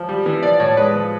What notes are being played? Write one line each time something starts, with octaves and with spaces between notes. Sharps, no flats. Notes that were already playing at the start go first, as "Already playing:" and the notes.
Already playing: F3
G3
E3
F3 D5
A2 C#5
G#3 B4
F3